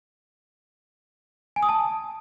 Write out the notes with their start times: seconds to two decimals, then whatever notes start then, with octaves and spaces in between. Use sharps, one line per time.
1.56 G#5
1.63 D#6
1.69 A5